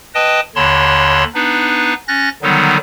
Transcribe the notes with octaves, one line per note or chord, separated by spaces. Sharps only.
B4 D#5 G5 A5 D#6
D#2 D3 C#5 A5 B5 C6
B3 D4 D#4 B4
C#4 F#6 A6 A#6
D3 D#3 F#3 G3 B3 D#4